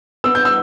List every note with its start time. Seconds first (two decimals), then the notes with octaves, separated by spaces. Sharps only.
0.24 B3 E6
0.35 G6
0.45 E6